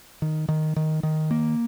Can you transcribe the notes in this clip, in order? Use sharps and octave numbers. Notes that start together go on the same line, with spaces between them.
D#3
D#3
D#3
D#3
A#3